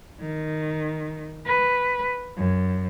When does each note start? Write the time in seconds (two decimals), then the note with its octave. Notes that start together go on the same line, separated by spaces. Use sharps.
0.21 D#3
1.46 B4
2.37 F#2